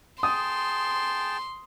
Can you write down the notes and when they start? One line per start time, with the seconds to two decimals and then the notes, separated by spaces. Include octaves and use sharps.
0.23 G#4 G5 A5 C6 D#6